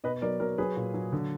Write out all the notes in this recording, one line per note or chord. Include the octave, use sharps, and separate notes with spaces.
B2 B4 D#5
F#3 A#4 D5
F#3 A#4
F#3 G#4 B4
A#2
F#3
D3